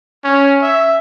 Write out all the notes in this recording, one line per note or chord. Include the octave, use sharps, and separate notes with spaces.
C#4
E5